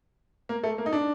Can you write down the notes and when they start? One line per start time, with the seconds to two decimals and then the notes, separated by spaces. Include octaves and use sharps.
0.49 A#3
0.63 A3
0.78 A#3
0.86 D#4
0.93 D4